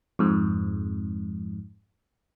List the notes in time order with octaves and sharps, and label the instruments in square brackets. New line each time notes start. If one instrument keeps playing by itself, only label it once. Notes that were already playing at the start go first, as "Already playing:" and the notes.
[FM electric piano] F2 G#2